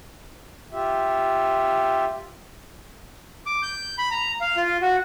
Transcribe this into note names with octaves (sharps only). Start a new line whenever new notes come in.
F4 G4 E5
D6
G6
B5
A#5
F5
F4
F#4